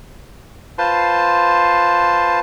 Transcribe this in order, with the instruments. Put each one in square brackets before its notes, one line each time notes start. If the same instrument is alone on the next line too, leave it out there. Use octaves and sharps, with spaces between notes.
[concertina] F4 B4 C5 A5 C6